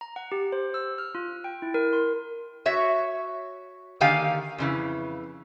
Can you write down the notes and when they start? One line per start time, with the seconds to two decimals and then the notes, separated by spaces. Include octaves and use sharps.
0.01 A#5
0.16 F#5
0.32 G4
0.52 C5
0.74 E6
0.98 F6
1.15 F4
1.44 G5
1.62 E4
1.74 A#4
1.93 C6
2.66 F#4 C#5 E5
4.01 D3 D#3 A#3 G4 F5 G#5
4.58 F2 C#3 E3